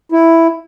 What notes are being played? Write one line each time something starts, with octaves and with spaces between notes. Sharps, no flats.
E4